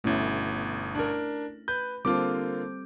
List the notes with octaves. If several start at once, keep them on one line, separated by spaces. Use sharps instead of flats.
G1 B2 A3 C#4 E4
D4 A#4
B4 G6
D3 G3 A#3 C4 F4 A4 D6